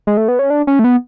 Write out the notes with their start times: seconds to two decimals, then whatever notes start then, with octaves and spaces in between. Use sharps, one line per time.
0.07 G#3
0.17 A3
0.28 B3
0.39 C#4
0.50 D4
0.67 C#4
0.79 A3
0.84 B3